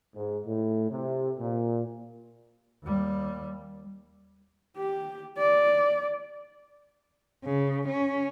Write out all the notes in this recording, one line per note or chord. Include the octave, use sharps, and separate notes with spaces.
G#2
A2
C3
A#2
D#2 G3
G4
D5
C#3
C#4